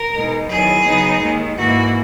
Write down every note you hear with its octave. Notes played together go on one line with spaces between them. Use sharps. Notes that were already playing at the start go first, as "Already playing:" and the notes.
Already playing: A#4
B2 G#3 D#4
E2 D#3 F#3 G#4
C#3 F#3 B3 D#4
D#2 D#3 G#3
G#2 E3 A#3 F#4